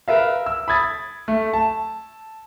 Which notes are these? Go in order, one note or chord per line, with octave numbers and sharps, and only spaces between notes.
A#4 B4 E5 F5
E6
B5 D#6 G#6 A6
A3
A5